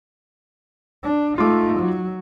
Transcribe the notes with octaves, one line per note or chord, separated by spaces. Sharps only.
D4
A3 D#4 F4 D6
F#3